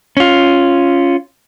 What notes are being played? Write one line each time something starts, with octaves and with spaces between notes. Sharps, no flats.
C#4 F4